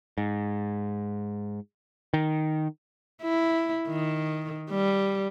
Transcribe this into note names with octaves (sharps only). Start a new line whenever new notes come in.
G#2
D#3
E4
D#3
G3